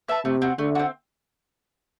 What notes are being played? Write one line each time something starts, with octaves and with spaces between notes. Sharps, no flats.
B4 E5 A5
C3 A3
C4 F#4
D3 A3
C4 F#4